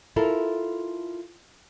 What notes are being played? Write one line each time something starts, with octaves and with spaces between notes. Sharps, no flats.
E4 F4 A4 A#4